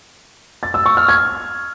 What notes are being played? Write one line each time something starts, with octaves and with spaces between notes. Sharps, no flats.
A6
E6
C#6
F6
G#6